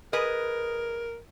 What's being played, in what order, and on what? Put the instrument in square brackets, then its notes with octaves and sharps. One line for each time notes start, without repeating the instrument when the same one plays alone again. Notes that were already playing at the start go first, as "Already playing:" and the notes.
[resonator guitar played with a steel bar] G#4 B4 D#5 [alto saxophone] A#4